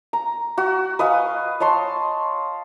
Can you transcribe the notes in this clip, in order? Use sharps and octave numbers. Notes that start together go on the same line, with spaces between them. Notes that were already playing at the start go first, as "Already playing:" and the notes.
A#5
F#4
B4 D#5 F5 G#5
C#5 D#5 A5 C6